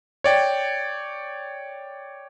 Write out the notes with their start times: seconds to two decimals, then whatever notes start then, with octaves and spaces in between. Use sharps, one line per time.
0.24 C#5 D5 G5